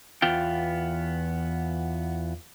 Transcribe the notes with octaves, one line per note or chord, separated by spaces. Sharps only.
E2 B3 F4 G5